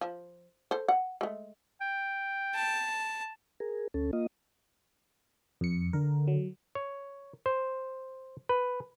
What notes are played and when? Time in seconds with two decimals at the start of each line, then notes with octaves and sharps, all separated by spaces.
0.01 F3
0.71 A4 C5
0.88 F#5
1.21 G#3 A3
1.81 G5
2.55 A5
3.60 G#4 A#4
3.94 D2 C#4 A4
4.13 A#3 F4 D#5
5.61 F2 C#7
5.93 D3 A#4
6.28 F#3
6.75 C#5
7.46 C5
8.49 B4